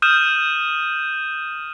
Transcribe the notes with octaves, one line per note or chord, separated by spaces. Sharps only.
D#6 F6 G6 D#7 E7